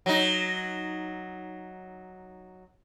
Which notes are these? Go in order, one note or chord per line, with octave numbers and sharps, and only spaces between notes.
F#3 D#4